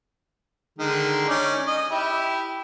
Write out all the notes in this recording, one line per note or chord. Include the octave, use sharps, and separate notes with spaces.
D3 D#3 G#3
C#4 D#4 D5
D#5
E4 G4